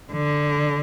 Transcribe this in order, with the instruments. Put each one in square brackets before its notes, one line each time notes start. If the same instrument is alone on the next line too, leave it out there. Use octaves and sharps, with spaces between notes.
[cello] D3